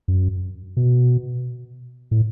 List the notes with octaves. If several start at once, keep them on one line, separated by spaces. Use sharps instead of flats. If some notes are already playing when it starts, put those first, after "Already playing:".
F#2
B2
A2